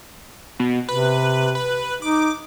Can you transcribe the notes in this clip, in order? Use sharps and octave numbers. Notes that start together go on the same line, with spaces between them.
B2
C3 B4
B4
D#4 D6